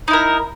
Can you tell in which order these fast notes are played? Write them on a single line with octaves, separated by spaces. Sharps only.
D#4 E4 A#4